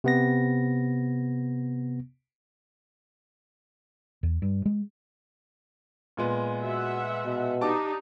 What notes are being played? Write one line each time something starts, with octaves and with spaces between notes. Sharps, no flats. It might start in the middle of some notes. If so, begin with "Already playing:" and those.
C3 B3 A#6
E2
G2
G#3
A#2 G#3 B3
F#4 E5 F#5
B2
D4 D#4 G4 A5 D6